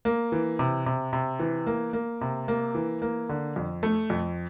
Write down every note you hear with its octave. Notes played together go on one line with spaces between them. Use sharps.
A#3
E3
C3
C3
C3
E3
A#3
A#3
C3
A#3
E3
A#3
D3
F2
A3
F2